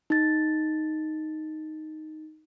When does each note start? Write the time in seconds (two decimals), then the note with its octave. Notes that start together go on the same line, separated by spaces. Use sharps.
0.10 D#4 A6